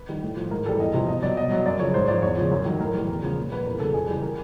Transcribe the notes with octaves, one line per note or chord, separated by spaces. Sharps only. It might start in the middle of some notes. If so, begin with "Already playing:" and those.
Already playing: B4
D#3 G3
A2
F3
G#2 A#4
E3 G3 A4
E2 D#5
C3 F3
B2 D#5
F#3 D5
B2 D#5
F#3
F#2 D5
C#3 F3 C#5
G#2 C5
F3 D5
E2 C#5
C#3 F3
F#2
D#3 F#3
A2 A#4
E3 G3
E2
C#3 F3
A#2
F3 B4
E2 A#4
C#3 F#3 A4
F2 G#4
C#3 E3 G3
A#4